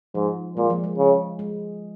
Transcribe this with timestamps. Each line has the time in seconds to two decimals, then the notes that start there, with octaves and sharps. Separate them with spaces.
0.15 G#2 F3
0.57 A#2 G#3
0.70 F3
0.84 G#3
0.98 C#3
1.39 G#3